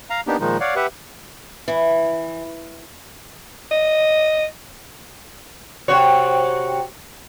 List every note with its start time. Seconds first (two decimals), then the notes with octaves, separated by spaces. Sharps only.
0.10 F5 A#5
0.27 A#3 B3 D4 D#4 G4
0.40 A#2 D#3 F3 G#3 D#4
0.60 C#5 D5 F5 F#5
0.76 G4 B4 E5 F#5
1.68 E3
3.71 D#5
5.88 C3 F#4 C#5